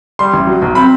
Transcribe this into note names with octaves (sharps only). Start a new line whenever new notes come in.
G3 C6
A1
F#3
B1
C4 B5